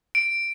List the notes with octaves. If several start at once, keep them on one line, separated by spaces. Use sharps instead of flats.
D7